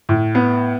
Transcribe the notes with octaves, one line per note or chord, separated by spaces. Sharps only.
A2
B3